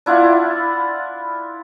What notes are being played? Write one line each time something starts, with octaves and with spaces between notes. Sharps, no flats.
D4 E4 F4 F#5